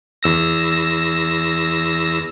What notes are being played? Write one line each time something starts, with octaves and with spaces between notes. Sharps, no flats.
E2 E6 A#6